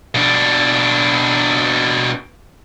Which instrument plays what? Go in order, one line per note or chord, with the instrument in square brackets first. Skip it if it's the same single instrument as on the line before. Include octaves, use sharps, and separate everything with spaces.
[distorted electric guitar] B2 D4